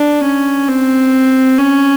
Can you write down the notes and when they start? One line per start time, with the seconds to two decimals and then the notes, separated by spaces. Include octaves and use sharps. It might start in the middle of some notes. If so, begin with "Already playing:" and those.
Already playing: D4
0.24 C#4
0.68 C4
1.58 C#4